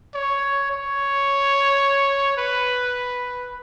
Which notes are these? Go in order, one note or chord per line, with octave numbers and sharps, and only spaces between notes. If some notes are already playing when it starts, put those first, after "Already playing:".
C#5
C#5
B4